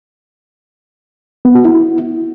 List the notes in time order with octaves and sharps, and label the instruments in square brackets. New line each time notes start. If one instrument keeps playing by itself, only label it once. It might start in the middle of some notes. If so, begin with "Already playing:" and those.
[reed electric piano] B3
F#4
E4